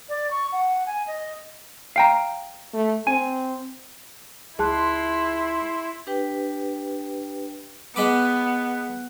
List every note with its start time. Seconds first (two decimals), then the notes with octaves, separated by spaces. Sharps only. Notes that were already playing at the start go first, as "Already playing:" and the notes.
0.09 D5
0.31 C#6
0.52 F#5
0.86 G#5
1.07 D#5
1.96 F5 G5 A#5
2.74 A3
3.07 C4 G#5
4.59 C#2 E4 G#4 A5 C6 F#6
6.07 D4 G4 B4 G5
7.96 G#3 B3 B5 D6